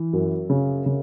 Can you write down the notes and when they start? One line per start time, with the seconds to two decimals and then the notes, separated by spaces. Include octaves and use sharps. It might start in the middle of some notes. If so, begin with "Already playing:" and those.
Already playing: E3
0.13 F#2
0.50 C#3
0.86 C#3